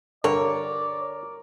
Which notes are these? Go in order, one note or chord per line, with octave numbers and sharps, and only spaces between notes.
G2 D3 A#4 C#5 D5